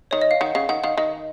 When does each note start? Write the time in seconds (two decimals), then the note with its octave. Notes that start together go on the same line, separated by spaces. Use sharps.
0.11 D#3 C#5
0.21 D#5
0.31 F5
0.41 D#3 F#5
0.55 C#3 F5
0.69 D#3 F#5
0.84 D#3 F5
0.97 D#3 D#5